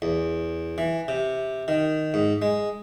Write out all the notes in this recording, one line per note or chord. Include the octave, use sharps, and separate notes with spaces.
E2
E3
C3
D#3
G#2
G#3